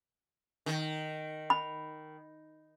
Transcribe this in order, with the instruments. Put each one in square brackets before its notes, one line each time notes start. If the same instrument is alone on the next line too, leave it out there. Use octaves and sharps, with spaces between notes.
[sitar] D#3
[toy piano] B5